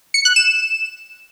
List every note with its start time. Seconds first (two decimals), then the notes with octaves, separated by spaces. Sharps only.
0.14 C#7
0.25 F#6
0.36 E7